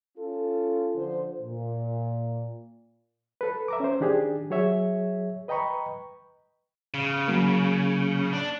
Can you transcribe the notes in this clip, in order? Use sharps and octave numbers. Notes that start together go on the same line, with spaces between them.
C#4 F4 A4
D3 F3 C5
A#2
A4 B4
E5 A#5 D6
C#4 C5
D#3 D4 G4 G#4
F#3 G#4 C#5 E5
B4 D#5 G5 A#5 B5 C#6
C#3
F#3 A#3
D4